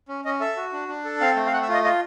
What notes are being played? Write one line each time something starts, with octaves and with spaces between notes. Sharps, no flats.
C#4
C#4 D#5
A4 E5
F#4
D4
D4
A4
C4 F5
A3
F5
A3 F#5
E5
F4 D#5
F4 D#5